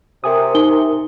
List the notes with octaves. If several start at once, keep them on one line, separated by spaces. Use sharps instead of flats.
C3 A#4 G#5 D#6
D#4 G7